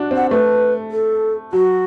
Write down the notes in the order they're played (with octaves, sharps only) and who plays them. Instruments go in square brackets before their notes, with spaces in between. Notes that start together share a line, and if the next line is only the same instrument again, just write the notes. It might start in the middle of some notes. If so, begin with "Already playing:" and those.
Already playing: [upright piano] D4 F#4
[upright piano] C4 [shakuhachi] F#5
[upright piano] A3 [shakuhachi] B4
[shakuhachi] A4
[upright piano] F#3 [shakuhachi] F#4